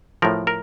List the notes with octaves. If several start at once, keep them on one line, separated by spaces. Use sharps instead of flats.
A2 F3 A#4
A#4